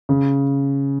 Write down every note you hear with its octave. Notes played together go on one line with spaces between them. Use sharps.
C#3